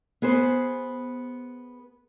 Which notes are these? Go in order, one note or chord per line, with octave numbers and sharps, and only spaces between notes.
B3 G#4 B4 C5